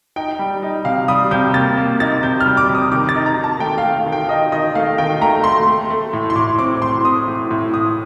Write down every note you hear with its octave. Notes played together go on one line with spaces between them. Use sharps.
D#4 G5
G3
D#4
C3 F5
G3 D#6
C3 G6
A#3 A6
A#3
D#4 A6
C3 G6
F6
G3
D6
C3
D#6
D#3 D6
A6
D#4
A#5
D#3
A5
A3 G5
F5
A3
D#3
G5
D#4 D#5
D#3 D#5
A3 F5
D#3 G5
A3 A#5
A3 C6
A3
A3
A2
C6
A2 D6
C4 D6
A2 C6
C4 D#6
A2
A2
A2 D#6